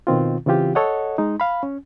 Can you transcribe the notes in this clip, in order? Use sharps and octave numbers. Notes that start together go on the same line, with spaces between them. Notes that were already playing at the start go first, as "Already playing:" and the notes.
B2 D#3 C4 F4
C#3 E3 C4 F4 G4
A4 C#5 D#5 F#5
G#3 D#4
F5 B5
C#4